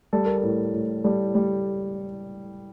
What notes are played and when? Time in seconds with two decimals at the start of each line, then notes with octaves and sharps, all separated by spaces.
0.13 G3 A4
0.26 A#4
0.38 A4
0.43 A2
0.74 A2
1.04 G3 A4
1.35 G3